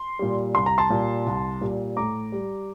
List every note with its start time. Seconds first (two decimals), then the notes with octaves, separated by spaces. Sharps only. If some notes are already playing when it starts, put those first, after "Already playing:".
Already playing: C6
0.19 A#2 G3
0.55 C2 C6
0.66 A#5
0.78 A5 C6
0.90 A#2 G3
1.26 C2
1.61 A#2 G3
1.97 A2 A#5 D6
2.32 G3